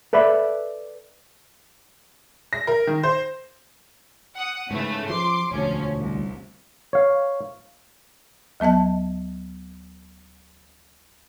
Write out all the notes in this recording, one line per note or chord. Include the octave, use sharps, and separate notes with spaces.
A4 B4 D5 E5 B5
A#6
A#4
D#3
C5
F#5 D#6
G#2 C#3 E3 A3
F3 C6 D6
E1 D2 F3 C#4
C2
C#5 F5
D2 F#3 B3 D#5 A5